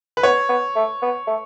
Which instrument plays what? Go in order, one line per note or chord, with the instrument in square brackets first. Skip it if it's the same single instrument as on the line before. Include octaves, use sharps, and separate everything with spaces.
[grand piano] B4
[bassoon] B3 [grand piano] C#5
[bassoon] B3
A3
B3
A3